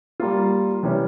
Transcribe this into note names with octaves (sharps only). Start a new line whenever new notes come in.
G3 A#3 F4
C3 E3 G3 C#4